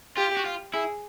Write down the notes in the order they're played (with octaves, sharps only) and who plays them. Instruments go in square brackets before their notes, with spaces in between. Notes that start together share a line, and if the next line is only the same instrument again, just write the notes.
[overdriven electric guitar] F4 [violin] G4
[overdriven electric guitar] F#4
F4
[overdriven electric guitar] E4 [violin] G#4